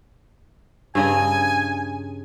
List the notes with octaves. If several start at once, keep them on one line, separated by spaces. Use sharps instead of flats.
G2 C#3 D#5 G#5